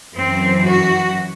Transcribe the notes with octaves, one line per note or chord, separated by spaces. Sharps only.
F#2 E3 C4
F#4